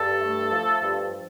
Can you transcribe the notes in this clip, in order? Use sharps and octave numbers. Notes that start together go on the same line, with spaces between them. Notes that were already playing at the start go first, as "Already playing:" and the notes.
Already playing: G2 A4
A3
F3
G2